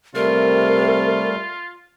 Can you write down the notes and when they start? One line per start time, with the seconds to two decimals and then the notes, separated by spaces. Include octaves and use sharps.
0.15 C3 G3 A3 F4 A#4